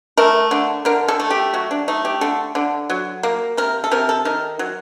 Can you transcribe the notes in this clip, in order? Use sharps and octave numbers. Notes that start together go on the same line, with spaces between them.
A3 A#4
D3
D3 A#4
A4
A3
G4
F#3 F#4
D4
A3 D#4
G4
D3 A4
D3
F#3
A#3
C3 A#4
A4
C3 A#4
A4
D#3 A#4
F#3